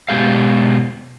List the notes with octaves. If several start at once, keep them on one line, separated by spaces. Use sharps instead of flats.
B2 G#3 G4 F5